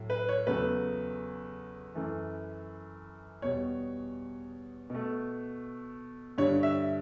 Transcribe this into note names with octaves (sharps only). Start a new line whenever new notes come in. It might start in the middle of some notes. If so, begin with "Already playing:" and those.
Already playing: A2 F#3
B4
C#5
E2 C#3 F#3 A3 B4
F#2 E3 A3
E2 B2 G3 C#5
B2 A3
G2 D3 G3 C#5
E5